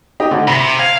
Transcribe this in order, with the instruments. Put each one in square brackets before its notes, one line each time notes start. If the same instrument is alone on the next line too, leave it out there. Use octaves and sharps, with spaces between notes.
[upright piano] D#4 G4 D#5
D2 D3
[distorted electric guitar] C3 [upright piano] B5
[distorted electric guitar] F5 [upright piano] G#6